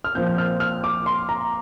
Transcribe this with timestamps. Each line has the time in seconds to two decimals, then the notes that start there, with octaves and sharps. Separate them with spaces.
0.04 F6
0.15 A#2 F3 C4 G6
0.27 G6
0.38 F6
0.60 F6
0.84 D6
1.06 C6
1.29 A#5